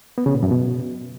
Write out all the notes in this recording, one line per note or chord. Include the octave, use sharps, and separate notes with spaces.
B3
C#3
A#2
F#2
B2